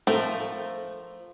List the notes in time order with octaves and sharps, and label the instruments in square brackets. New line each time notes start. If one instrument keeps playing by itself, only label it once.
[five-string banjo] F3 A#4 [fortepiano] A3